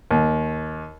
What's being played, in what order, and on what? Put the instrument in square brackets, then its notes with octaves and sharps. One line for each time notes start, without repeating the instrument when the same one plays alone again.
[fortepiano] D#2